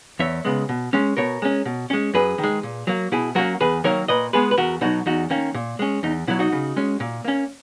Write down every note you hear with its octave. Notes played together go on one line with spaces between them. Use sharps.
E2 C#5 E5
C#3 G#3 B3
B2
G#3 C#4
B2 A#4 C#5
G#3 C#4
B2
G#3 C#4
F#2 G#4 B4
D#3
G#3
A#2
F#3 A#3
B2 E4 G#4
F#3 A#3 C#4 F#4 A#4
E2 G#4 B4
D#3 F#3 A#3 A#4 C#5
A#2 B4 D#5
G#3 B3 G#4 B4
B4
E2 F#4 A#4
B2 F#3 D#4 F#4
E2 D#4 F#4
D#3 A#3 C#4
A#2
G#3 C#4
E2 D#4
B2 F#3 E4
D#4 F#4
C#3
G#3 C#4
A#2
A#3 C#4